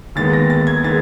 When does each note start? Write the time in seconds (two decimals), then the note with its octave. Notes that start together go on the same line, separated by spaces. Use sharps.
0.15 D#2 D#3 G#3 B3 A6
0.33 A#6
0.50 A6
0.67 G#6
0.83 D#3 G#3 B3 A6